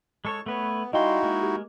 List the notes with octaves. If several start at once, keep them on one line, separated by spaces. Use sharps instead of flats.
G#3 A4 C#5 C#6
A3 B3 B4 C#5
G3 D#4 E4 F#4 D#5 F5 G5 C6
G#3 A#3
G4